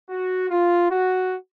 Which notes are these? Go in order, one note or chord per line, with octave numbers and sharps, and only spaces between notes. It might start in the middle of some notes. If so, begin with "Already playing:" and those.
F#4
F4
F#4